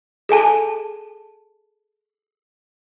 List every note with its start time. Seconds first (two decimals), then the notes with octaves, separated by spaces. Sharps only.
0.29 G#4 A4 G#5 A5